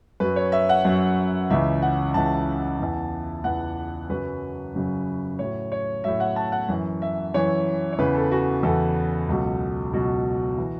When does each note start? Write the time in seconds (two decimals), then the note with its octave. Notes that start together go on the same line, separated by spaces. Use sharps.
0.20 F#2 F#3 B4
0.36 C#5
0.52 E5
0.69 F#5
0.85 F#2 F#3
1.50 C#2 C#3 E3 E5
1.82 F#5
2.14 C#2 C#3 E3 A5
2.80 E2 E3
3.44 E2 E3 F#5
4.09 F#2 C#3 F#3 B4
4.74 F#2 C#3 F#3
5.39 A2 F#3 C#5
5.72 C#5
6.04 A2 F#3 E5
6.20 F#5
6.36 A5
6.52 F#5
6.68 F#2 E3
7.02 E5
7.34 F#2 E3 C#5
7.93 C#5
7.99 E2 C#3 E3 B4
8.15 A4
8.31 F#4
8.63 E2 C#3 E3 A4
9.28 C#2 B2 F#3
9.93 C#2 B2 F#3 F#4
10.58 E3